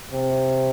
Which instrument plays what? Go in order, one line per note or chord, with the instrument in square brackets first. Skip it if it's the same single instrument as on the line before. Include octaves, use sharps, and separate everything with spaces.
[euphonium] C3